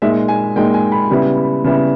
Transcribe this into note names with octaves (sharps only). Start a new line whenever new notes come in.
A#2 G#3 D#4 E5
G#5
A#2 G#3 D#4 G5
G#5
B5
C#3 G3 B3 E4
C#3 G3 B3 E4